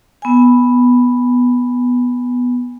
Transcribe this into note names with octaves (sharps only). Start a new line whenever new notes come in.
B3 G#5